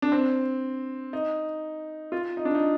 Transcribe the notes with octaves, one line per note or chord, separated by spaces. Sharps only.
D4
C4
D#4
F4
D#4
D4
D#4